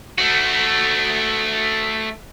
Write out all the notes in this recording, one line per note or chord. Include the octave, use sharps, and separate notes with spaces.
A3 F#4